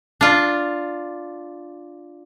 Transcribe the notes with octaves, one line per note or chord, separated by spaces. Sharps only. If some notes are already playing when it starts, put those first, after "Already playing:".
D4 F4